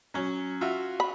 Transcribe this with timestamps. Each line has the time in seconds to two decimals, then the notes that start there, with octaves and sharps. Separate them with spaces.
0.14 F#3 C#4
0.61 F4 F#4 E5
1.00 B5